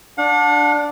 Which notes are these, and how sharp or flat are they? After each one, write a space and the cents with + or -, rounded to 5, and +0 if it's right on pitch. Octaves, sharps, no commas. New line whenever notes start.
D4 +0 F#5 -45